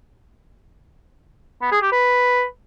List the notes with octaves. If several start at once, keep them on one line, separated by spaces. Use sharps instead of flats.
B3
G#4
G4
B4